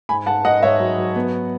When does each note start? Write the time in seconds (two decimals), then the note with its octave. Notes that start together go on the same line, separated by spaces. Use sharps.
0.09 G#2 G#5 B5
0.26 G#2 F#5 A5
0.44 G#2 D#5 F#5
0.63 G#2 C#5 E5
0.80 F#3
0.98 F#3
1.16 B3